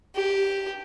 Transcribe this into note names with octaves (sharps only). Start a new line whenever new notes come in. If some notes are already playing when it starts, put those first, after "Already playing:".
G4